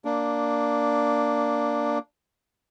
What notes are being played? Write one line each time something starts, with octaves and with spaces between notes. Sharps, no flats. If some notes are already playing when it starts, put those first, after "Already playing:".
A#3 D4